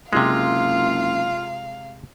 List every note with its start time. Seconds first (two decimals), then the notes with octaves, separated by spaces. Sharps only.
0.13 F#1 C3 G#3 F4 F5